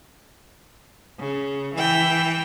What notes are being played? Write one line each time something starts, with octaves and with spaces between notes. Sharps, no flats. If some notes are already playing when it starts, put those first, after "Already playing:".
C#3
E3 G5